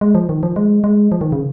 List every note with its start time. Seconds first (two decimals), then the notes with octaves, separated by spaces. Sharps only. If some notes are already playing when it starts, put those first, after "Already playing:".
0.01 G#3
0.15 F3
0.29 D#3
0.43 F3
0.56 G#3
0.84 G#3
1.12 F3
1.21 D#3
1.32 C#3